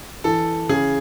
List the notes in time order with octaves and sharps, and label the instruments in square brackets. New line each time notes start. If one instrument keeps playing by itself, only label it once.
[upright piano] E3 [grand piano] A4
[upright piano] C#3 [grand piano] G#4